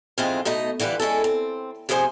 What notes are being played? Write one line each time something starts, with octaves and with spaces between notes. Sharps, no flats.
F2 G#2 E3 G#3 C4 F4
B2 A3 D#4 D#5
D3 E3 G3 F4 B4
G#3 C#4 E4 A4
C4
C3 F3 E4 G#4 C5 G#5